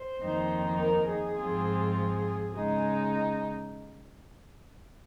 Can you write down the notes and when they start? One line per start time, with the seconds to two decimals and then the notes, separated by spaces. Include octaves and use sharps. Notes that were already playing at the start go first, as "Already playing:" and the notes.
Already playing: C5
0.21 F2 D#3 A#3 D#4
0.79 A#4
1.08 G#4
1.37 G#2 F3 C4 F4
1.96 G#4
2.54 C#3 G#3 D#4 G#4